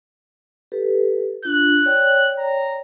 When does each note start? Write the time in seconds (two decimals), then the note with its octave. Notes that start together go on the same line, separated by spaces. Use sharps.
0.72 G4 A4 B4
1.45 D4 F4 F#6
1.86 C#5 D5 G5
2.38 A#5